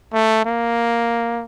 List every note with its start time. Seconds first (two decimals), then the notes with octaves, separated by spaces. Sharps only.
0.13 A3
0.46 A#3